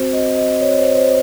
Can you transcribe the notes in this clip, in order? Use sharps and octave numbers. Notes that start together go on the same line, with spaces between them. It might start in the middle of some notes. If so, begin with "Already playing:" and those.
Already playing: C4 F#4 C5
D#5
D#5
C#5
C5
C5